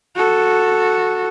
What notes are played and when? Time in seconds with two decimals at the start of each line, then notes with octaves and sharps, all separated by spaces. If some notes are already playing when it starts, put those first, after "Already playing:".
0.16 F#4 A4